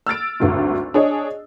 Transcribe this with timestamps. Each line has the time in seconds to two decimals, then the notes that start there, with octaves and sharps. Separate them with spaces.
0.07 E6 F6 A6 D7
0.40 G#1 D2 G2
0.94 D4 G#4 C#5 D#5